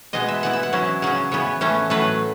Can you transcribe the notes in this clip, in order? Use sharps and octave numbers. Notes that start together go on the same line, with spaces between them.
B2 G#3 B3 D#5
E5
E3 B3 E4 F#5
E5
F#5
F#3 C#4 E4
C#3 F#3 C#4 F#5
C#3 E3 B3 C#5
A2 E3 A3 C#4
A2 F#3 A3 B4